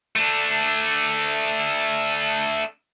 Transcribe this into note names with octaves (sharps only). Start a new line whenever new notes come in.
A3 D4